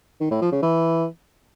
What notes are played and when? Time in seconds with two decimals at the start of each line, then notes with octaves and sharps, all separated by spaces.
0.21 D#3
0.31 A2
0.42 F3
0.52 C#3
0.63 E3